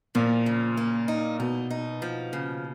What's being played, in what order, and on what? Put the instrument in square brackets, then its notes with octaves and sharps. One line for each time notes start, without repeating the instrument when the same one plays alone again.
[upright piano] A#2 [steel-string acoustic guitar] F3
[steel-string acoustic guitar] C#3
A#3
D#4
[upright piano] B2 [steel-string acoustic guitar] D#4
[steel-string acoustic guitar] D#4
F3
C#3